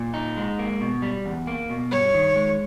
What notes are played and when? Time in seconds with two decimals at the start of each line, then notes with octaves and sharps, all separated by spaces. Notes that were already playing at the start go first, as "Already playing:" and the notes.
Already playing: A#2
0.14 D#4
0.37 G#3
0.59 A#3
0.81 B2
1.02 G3
1.26 E2
1.47 A#3
1.70 B2
1.91 G2 C#5
2.14 D#3
2.36 G#3